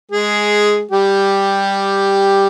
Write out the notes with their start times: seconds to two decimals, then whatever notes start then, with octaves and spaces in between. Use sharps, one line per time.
0.11 G#3 G#4
0.91 G3 G4